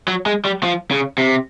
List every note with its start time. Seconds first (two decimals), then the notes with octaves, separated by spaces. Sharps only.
0.08 F#3
0.26 G#3
0.45 G3
0.63 F3
0.91 C#3
1.18 C3